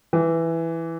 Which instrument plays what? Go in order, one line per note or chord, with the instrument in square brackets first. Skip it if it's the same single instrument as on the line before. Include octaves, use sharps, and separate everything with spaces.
[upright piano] E3